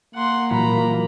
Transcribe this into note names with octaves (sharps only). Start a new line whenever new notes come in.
A#3 F#5 C6
A#2 E3 F#3 A#5 B5